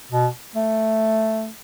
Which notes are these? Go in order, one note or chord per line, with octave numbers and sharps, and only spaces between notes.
B2
A3